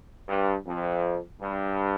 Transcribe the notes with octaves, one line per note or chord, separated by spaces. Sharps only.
G2
F2
G2